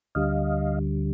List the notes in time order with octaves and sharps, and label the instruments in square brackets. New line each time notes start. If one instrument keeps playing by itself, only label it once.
[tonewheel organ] D2 D3 G3 D#5 F5